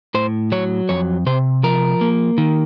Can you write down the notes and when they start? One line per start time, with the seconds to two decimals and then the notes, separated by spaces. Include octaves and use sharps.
0.14 A2 C5
0.52 F#3 C#5
0.89 F2 C#5
1.26 C3 C5
1.63 F3 A#4
2.01 A#3
2.38 D#3